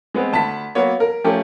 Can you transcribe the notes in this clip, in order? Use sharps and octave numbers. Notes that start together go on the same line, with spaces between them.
G#3 B3 C4
D2 A5 B5 B6
F#3 A#3 B3 C#5
A#4
F3 A3 C#4 G4 A#4